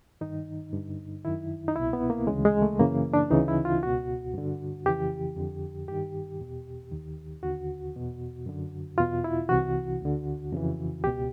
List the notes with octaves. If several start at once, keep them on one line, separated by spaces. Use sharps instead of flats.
G2 D#3 D#4
G2 D3
F#2 D#3 E4
D#4
C2 B2 E4
B3
A#3
D2 C#3 E3 G#3
G#3
A3
F#2 C#3 E3 A#3
D4
D2 C#3 E3 D#4
E4
F4
C#2 B2 F#4
G2 D3
F2 C#3 E3 G4
F2 D3
G2 D#3 G4
E2 B2
D#2 D#3
D#2 D3 F#4
E2 B2
F#2 D3
E2 B2 F4
E4
C2 C3 E3 F#4
D2 D3
F2 C#3 E3
C#2 B2 G4